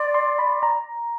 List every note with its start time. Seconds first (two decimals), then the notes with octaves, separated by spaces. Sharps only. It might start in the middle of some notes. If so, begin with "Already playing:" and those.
Already playing: D5 C6 D6
0.14 C6
0.39 B5
0.63 A#5